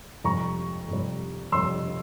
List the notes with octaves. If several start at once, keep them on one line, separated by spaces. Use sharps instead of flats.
F2 C3 G3 A#5 C#6
F2 C3 G3
F2 C3 G3 C6 E6